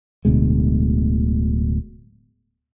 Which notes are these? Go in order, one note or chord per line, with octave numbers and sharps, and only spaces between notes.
D1 D2 B2 G#3